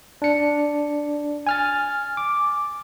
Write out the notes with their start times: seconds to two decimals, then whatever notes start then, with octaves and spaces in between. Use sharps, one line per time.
0.22 D4 C#7
1.47 G#5 F6 A6
2.17 D6